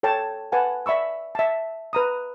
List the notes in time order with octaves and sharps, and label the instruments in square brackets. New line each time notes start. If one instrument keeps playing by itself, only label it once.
[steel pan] A4 C#5 G5 A5
B4 F#5 G#5 A5
D5 E5 B5 C#6 E6
E5 A5
B4 A#5 D#6